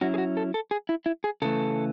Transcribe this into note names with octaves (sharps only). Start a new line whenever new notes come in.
F#3 C#4 E4 F#4
G#4
F#4
A4
A4
G#4
E4
E4
G#4
C#3 E3 A3 A4